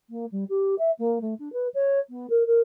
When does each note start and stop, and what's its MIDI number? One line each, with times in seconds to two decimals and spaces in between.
0.09 0.25 58
0.31 0.44 55
0.49 0.75 67
0.78 0.91 76
0.98 1.18 58
1.21 1.34 57
1.39 1.52 62
1.52 1.67 71
1.74 1.99 73
2.10 2.26 59
2.29 2.43 70
2.46 2.60 70